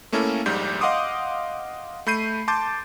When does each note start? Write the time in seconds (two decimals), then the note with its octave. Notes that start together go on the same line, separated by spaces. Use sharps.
0.12 A3 A#3 C#4 E4 A4
0.46 A#1 G#2 G3 G6
0.81 D#5 F5 F#5 C6 D6 D#6
2.07 A3 B5 G6 C7 D#7
2.48 A5 C6 D6 G6 A6